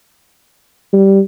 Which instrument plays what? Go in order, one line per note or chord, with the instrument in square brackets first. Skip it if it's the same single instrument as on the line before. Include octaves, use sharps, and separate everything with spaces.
[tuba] G3